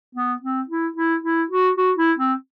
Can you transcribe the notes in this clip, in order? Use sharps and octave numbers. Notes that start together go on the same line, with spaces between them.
B3
C4
E4
E4
E4
F#4
F#4
E4
C4